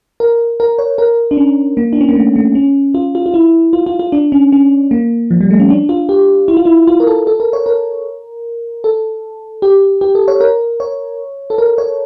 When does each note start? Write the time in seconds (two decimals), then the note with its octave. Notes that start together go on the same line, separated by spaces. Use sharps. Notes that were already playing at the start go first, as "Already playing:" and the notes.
0.20 A#4
0.60 A#4
0.79 C#5
0.98 A#4
1.31 D4
1.37 C#4
1.77 A#3
1.93 D4
2.01 C#4
2.09 A#3
2.16 A3
2.36 A3
2.55 C#4
2.94 F4
3.15 F4
3.26 F4
3.34 E4
3.73 F4
3.86 F4
3.99 F4
4.12 D4
4.32 C#4
4.52 C#4
4.91 A#3
5.31 F3
5.41 G3
5.51 A3
5.60 C#4
5.70 D4
5.89 F4
6.09 G4
6.48 E4
6.57 F4
6.65 E4
6.87 F4
7.00 A#4
7.07 A4
7.27 A4
7.40 A#4
7.53 C#5
7.66 A#4
8.84 A4
9.62 G4
10.01 G4
10.15 A4
10.28 C#5
10.41 A#4
10.80 C#5
11.50 A4
11.58 A#4
11.78 C#5